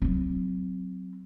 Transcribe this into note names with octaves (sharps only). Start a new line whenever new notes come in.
F#3 C4